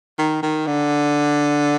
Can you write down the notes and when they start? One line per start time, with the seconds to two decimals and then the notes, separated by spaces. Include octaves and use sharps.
0.19 D#3
0.43 D#3
0.67 D3